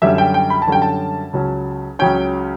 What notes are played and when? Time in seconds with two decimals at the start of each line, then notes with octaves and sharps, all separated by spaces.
0.02 F#2 D3 G3 C#4 E5
0.18 G5
0.34 G5
0.50 B5
0.62 A5
0.67 F#2 D3 G3 C#4 G5
0.82 A5
1.33 C#2 C#3 F#3 C#4
1.99 C#2 C#3 F#3 C#4 G5